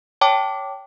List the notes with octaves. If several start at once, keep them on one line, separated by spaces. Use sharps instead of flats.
C#5 G5 A5 D6